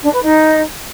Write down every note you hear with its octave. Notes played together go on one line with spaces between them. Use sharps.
D4
B4
D#4